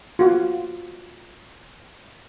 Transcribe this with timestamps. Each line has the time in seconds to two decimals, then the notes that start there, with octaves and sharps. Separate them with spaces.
0.19 F4 F#4